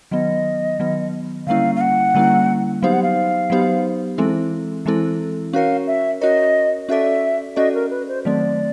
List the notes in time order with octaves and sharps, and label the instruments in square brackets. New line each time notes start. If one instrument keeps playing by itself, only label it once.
[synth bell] D#3 F#3 B3 [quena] D#5
[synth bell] D#3 F#3 B3
[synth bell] D3 G3 A#3 C#4 E4 [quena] F5
[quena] F5
F#5
[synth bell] D3 G3 A#3 C#4 E4
[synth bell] F#3 B3 D#4 G4 C5 [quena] F5
[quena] F#5
F5
[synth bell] F#3 B3 D#4 G4 C5
E3 G#3 C4 E4 A4
E3 G#3 C4 E4 A4
[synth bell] C#4 F#4 A#4 C#5 [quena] F5
[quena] E5
[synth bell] C#4 F#4 A#4 C#5 [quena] D#5
[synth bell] C#4 F#4 A4 D5 [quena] E5
[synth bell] C#4 F#4 A4 D5 [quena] D#5
[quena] A#4
B4
C5
[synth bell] D#3 F#3 A3 C4 [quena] D5